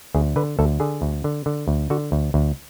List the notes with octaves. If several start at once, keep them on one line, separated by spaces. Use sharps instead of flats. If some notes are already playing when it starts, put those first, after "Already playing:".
D2 G#4
D3 B4
D2 A4
D3 G#4
D2
D3
D3
D2
D3 F#4
D2
D2